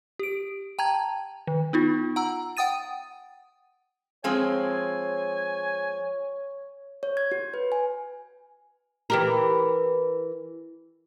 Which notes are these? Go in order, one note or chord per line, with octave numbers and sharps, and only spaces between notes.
G4 D7
G5 A5 A#5 G#6
D#3
B3 D#4 F4
F#5 A#5 E6
F#5 G5 D#6 A6 D#7
F3 G#3 C4 C#5 G#5
C#5
G#6
F#4
B4
G#5
E3 G4 A#4